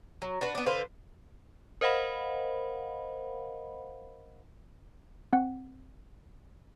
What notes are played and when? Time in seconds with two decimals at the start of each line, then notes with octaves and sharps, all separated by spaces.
0.22 F#3
0.41 D4 F#4 B4
0.55 B3 D4
0.66 D3 B4 C5 F5
1.81 A#4 C5 D#5 F5 F#5 B5
5.33 C4 F#5